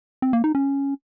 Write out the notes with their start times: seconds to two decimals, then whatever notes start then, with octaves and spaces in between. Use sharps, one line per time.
0.22 C4
0.33 A#3
0.44 D#4
0.55 C#4